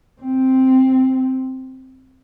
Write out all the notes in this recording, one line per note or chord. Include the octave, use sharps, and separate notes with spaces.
C4